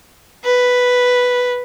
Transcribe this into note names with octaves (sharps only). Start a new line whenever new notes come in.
B4